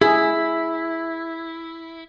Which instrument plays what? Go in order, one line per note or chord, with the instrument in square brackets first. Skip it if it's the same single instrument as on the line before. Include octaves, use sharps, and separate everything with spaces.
[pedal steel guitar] E4 [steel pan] G#4